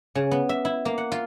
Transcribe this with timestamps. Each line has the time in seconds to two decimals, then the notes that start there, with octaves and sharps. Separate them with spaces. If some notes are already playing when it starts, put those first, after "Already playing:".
0.15 C#3
0.31 B3
0.49 E5
0.65 E4
0.85 A#3
0.98 F#5
1.12 F4